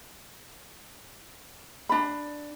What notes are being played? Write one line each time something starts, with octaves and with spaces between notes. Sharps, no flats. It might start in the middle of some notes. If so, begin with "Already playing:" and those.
D4 B5